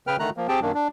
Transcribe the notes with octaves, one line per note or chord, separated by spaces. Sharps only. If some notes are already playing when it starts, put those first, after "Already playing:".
C#3 B4 G5 F6
D3 D#3 A3 A#5 F#6
F3 A#3
C4 G4 G#4 G5 A5
F#2 D#3 A#3 D4
D4